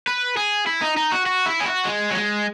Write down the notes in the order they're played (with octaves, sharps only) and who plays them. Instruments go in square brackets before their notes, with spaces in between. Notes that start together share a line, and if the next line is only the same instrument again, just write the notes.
[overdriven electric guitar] B4
G#4
E4
D#4
D#4
F#4
F#4
E4
G#4
F#4
G#3
F#3
G#3